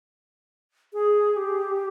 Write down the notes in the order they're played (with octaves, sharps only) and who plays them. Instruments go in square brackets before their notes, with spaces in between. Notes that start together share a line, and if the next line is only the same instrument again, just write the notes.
[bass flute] G#4
G4